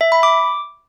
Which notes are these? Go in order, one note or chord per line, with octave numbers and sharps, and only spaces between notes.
E5
B5
D6